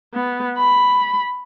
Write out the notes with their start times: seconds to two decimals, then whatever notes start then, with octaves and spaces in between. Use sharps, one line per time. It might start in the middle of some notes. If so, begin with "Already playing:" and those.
0.14 B3
0.58 B5